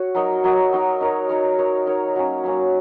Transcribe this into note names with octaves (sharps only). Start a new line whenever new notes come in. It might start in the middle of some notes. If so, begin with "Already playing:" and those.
Already playing: F#4 C#5
F#3 D#4 A#4
F#3 D#4 A#4
F#3 D#4 A#4
D#4 A#4 C#5
D#4 A#4 C#5
D#4 A#4 C#5
D#4 A#4 C#5
F#3 A#3 C#4
F#3 A#3 C#4